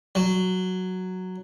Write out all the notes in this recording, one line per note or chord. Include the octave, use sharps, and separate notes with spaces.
F#3